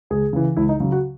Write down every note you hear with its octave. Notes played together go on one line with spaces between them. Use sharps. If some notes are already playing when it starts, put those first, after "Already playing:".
C#2 G#4
C#3 E3
C#2 E4
D#4
C#3 F#3
F#4